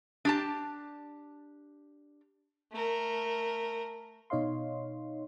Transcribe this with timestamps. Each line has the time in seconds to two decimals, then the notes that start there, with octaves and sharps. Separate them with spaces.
0.25 D4 G4 A5
2.72 A3 A#4
4.30 B2 D#4 C#5 D#5 F5 C6